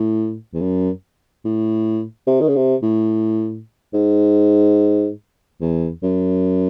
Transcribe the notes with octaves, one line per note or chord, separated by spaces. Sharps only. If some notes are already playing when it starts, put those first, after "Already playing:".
Already playing: A2
E2
F#2
A2
C3
D#3
C#3
C3
A2
G#2
E2
F#2